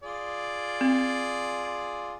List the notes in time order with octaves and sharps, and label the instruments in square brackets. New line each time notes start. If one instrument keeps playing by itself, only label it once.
[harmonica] F4 G#4 D5
[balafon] C4